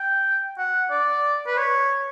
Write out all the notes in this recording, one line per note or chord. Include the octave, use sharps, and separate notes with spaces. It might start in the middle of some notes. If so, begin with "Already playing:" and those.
Already playing: G5
F#5
D5
B4
C#5